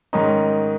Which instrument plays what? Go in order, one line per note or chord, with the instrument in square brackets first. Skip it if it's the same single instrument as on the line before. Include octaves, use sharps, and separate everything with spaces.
[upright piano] G#2 D#3 C#4 D#4